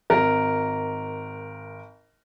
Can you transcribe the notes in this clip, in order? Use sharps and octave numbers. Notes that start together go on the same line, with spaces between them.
G#1 A#4 A#6